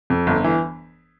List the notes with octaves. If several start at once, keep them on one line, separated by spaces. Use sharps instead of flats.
F2
G1
E3